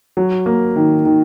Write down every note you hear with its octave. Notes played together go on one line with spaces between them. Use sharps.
F#3
A#3
D#3
D#3